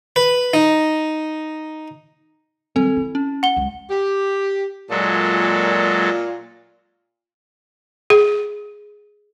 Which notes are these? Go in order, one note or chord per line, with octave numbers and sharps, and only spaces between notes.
B4
D#4
D#3 G3 C4 A4
E4
C#4
F#5 G7
C#2
G4
A#2 F#3 G#3 A4
G#4